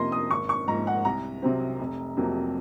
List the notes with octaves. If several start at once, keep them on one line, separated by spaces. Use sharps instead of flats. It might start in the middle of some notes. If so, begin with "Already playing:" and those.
Already playing: F2 C3 F3 A#3 D#5 C6
D#6
G#1 C#6
C#6
G#2 F3 A#3 A#5
F#5
C2 A#5
C3 F#3 C4
F1
F2 C3 F#3 A#3